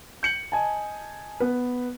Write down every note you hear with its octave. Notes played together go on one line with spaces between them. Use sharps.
G6 C#7 F#7
D#5 G#5 A5
B3 B4